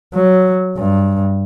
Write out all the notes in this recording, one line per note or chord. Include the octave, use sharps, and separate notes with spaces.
F#3
G2